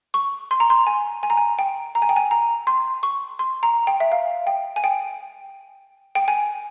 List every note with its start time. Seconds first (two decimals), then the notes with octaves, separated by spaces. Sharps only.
0.14 C#6
0.51 C6
0.60 A#5
0.70 C6
0.87 G#5
1.23 G#5
1.30 A#5
1.37 G#5
1.59 G5
1.95 A#5
2.02 G#5
2.09 G5
2.16 G#5
2.31 A#5
2.67 C6
3.03 C#6
3.39 C6
3.63 A#5
3.87 G5
4.00 E5
4.12 F5
4.47 G5
4.76 G#5
4.84 G5
6.15 G5
6.28 G#5